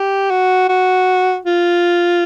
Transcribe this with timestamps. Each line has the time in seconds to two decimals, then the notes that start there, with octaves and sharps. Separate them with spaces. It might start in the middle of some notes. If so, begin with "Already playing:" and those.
Already playing: G4
0.30 F#4
0.69 F#4
1.45 F4